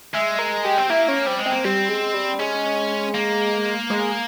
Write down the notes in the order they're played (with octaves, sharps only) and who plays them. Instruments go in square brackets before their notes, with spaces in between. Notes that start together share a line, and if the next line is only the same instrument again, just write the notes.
[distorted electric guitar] G#3 [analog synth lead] E5
[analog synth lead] A#4
G4
[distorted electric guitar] C4
[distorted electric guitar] A#3 [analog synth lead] E4
[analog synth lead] C#4
[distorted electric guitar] G3 [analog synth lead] C4
[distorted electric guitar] G#3
[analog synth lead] C4
[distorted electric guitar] A#3
[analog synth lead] G3 [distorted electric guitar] C4
[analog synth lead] G#3
G3
[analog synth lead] G#3 [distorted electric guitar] C#4
[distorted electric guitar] A#3
[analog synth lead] G#3